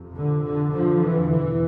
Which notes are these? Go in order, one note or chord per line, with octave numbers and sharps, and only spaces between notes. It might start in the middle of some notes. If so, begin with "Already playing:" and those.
Already playing: F2 C3
D3
D3
D3 F3
E3
E2 B2 E3